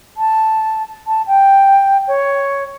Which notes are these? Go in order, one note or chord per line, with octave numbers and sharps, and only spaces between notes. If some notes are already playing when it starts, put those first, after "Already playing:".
A5
A5
G5
C#5